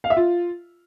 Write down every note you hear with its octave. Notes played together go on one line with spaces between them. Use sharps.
F5
E5
F4